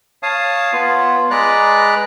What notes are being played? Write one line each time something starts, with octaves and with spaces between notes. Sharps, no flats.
C#5 F5 A5 D#6
B3 F4
G#3 B4 D5 A#5 F#6